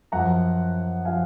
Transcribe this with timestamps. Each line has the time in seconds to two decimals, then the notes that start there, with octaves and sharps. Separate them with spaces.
0.12 F#2 F3 F#5 A#5
1.05 F3 F5 G#5